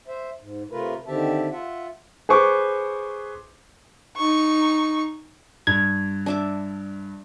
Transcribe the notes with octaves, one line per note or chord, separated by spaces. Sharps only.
C5 E5
G#2
C3 A3 F4 A#4 B4
D3 D#3 C4 G4 E5 A5
F4 E5 F#5
G#4 B4 C5 C#6 D6
D#4 C#6
G2 G#6
D4 E5 D6